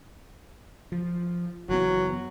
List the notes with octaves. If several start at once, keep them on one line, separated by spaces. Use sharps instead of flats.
F3
F#1 E3 F#3 B3